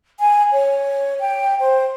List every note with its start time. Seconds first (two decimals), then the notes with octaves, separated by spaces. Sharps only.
0.20 G#5
0.52 C#5
1.20 G5
1.60 C5